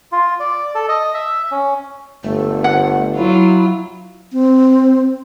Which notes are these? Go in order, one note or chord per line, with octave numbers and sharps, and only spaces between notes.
F4
D5
A4
D#5
E5
C#4
G1 A3
F#5
F#3 E4 F4
C4